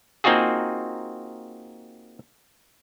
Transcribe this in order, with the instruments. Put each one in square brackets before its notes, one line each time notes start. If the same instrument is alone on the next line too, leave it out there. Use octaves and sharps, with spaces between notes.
[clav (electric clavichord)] A#3 C4 D#4 F4 F#4 G#4